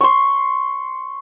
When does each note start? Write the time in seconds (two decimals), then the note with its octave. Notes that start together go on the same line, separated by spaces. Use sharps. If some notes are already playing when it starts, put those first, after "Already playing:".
0.01 C6 C#6